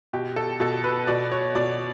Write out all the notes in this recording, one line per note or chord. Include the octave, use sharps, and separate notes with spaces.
B2 G4
A4
B2 A4
B4
B2 D5
C#5
B2 D5